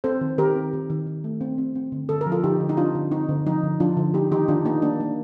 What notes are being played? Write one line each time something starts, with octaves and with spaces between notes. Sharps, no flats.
C4 A4 C5
D#3
D#3 G4 A#4
C4
D#3
D#3
D#3
A3
C4
C4
C4
D3
D3 A4
A#4
F3
F4 A4
D3 D#4 G4
D3
D#4
C4 D4 F4
D3
C4 D#4
D3
F3 D#4
D3
F3 D4 F4
D3
A#3 D#4 G4
D#3 D#4 G4
D#3 D4 F4
A#3 D#4
A#3 D4
A#3